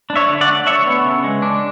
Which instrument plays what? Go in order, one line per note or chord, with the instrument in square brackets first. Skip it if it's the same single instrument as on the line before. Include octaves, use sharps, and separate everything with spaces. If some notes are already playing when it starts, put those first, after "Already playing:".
[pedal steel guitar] D4
C#5 E5
D3
D5 F#5
A3
D4 C#5 E5
B3
C#3
G#3
D4